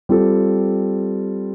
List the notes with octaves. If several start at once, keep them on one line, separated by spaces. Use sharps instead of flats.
G3 C4 F4 A4